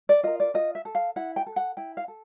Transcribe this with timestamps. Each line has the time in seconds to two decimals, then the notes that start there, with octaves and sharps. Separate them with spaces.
0.09 D5
0.23 F4 A#4 D#5
0.40 D5
0.54 F4 D#5
0.75 E5
0.85 A4
0.95 F5
1.16 E4 F#5
1.36 G5
1.46 A4
1.56 F#5
1.77 E4 G5
1.97 F5
2.08 A4